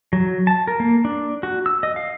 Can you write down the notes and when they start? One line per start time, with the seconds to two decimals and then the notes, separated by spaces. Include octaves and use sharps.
0.13 F#3
0.47 A5
0.67 A#4
0.80 A#3
1.05 D4
1.43 F#4
1.66 E6
1.83 D#5
1.96 F5